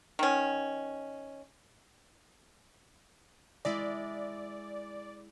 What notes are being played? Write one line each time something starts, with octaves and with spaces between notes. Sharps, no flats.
D#3 C#4
G#3 E4 D5